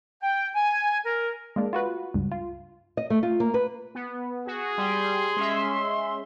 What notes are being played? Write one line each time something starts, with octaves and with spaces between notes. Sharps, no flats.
G5
G#5
A#4
G#3 A#3 D4
F4 F#4 B4
C#2 G2
F4
D#5
A3
F4
A#3
B4
B3
F#4 G#4
G3 C6
G#3 C#4 E5